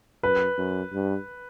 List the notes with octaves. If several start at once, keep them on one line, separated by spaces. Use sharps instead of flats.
F#2 B4
F#2
G2